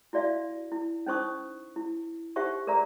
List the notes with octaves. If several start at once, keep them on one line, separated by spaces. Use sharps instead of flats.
E4 F#4 D5 E5 F5
E4
C#4 D#4 C5 C#6 D#6
E4
D#4 G4 C5 E5 F#5 C#6
G#4 A#4 D5 E5 A#5